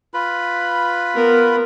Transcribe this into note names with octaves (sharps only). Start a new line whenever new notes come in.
F4 B4 B5
B3 A#4